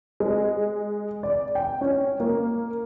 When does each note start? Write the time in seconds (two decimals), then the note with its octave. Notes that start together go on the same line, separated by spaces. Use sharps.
0.20 G#3
1.23 D5
1.55 G5
1.81 C#4
2.20 A#3